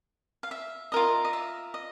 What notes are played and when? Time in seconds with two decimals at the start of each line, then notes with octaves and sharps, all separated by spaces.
0.43 F5
0.51 E5
0.92 F4 A#4 D#5
1.25 D#5
1.33 E5
1.74 D#5